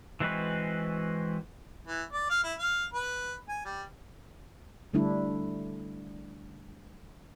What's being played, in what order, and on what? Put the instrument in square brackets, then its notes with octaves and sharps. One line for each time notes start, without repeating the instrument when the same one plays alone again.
[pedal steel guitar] E3 G#3 C4 F#4 B4
[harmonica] E3
D5
F5
E4
F5
B4
G#5
G3
[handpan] D3 G3 A3 D4 E4